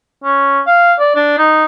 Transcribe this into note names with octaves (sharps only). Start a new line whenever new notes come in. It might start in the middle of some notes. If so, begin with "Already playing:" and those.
C#4
F5
D5
D4
D#4